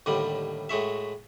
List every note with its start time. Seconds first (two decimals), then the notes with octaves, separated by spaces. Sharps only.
0.06 D#2 A2 D3 G3
0.69 A2 G#3 F#4 E5